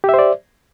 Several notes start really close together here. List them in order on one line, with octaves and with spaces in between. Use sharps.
G4 E5 C5 D5